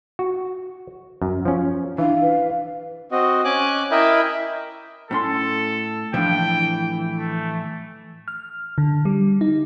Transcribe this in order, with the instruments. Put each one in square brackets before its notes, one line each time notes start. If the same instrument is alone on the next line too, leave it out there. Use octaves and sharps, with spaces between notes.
[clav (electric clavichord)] F#4
F#2
F3 C#4
[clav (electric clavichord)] E3 [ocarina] D4 [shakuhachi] F5
[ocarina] B4
[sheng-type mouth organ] C4 F#4 D#5
C#4 G#5 D6 F#6
E4 A#4 D#5 E5 G5 B5
[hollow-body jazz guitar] A2 C#4 C6 [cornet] A4
[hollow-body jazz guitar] A2 F3 D4 [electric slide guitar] E3 [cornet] G5
[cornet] A3
[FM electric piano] F6
D3
G3
D#4